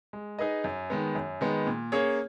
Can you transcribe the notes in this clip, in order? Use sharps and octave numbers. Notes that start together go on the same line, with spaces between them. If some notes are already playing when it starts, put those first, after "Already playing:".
G#3
D#4 G#4 B4 D#5
F#2
D#3 G#3 B3
F#2
D#3 G#3 B3
A#2
A#3 C#4 G#4 C#5